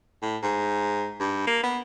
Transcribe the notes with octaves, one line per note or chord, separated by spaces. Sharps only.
A2
G#2
G2
A#3
B3